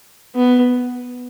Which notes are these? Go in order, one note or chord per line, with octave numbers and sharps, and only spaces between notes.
B3